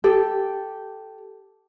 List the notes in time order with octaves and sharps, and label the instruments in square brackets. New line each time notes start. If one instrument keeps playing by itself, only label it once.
[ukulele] G4 A4